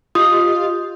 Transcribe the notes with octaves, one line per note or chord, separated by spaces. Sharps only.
F4 G4 D#5 D#6